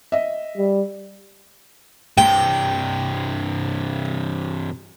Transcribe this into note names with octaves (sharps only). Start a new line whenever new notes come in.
D#5 E5
G3
G2 C3 G5